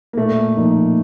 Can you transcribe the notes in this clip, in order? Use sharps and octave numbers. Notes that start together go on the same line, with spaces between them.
A#3
A#2 A3
F3 A#3 D#4